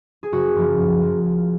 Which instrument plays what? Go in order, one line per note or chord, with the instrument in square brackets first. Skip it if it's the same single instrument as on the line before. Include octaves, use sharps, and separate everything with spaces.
[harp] G#4
F#1 F#4
F#2 F3 A#3
F#2
F3 A#3
C#2